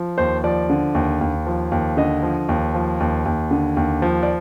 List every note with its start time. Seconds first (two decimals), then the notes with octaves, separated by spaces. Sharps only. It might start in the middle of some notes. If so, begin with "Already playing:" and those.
Already playing: F3
0.18 D#2 C5
0.44 F3 D5
0.70 D3
0.95 D#2
1.21 D#2
1.47 F3
1.72 D#2
1.97 D3 D#5
2.23 F3
2.49 D#2
2.74 F3
3.00 D#2
3.25 D#2
3.51 D3
3.77 D#2
4.02 F3
4.23 D5